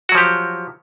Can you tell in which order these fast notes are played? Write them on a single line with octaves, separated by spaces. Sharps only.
F#4 F#3 F3 G4